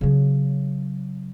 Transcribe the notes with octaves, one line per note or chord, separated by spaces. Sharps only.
C#3 F#3